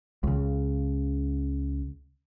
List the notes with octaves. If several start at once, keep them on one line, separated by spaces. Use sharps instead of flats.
C#2 C#3